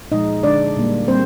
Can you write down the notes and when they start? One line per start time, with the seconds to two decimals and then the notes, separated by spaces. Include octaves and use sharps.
0.12 A#2 F3 G#3 D#4 D#5
0.43 D3 G#3 D4 D5
0.77 A#2 G3 A#3
1.08 G3 A#3 C4 C5